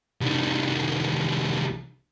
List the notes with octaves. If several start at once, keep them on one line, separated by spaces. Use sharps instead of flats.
C2 D#3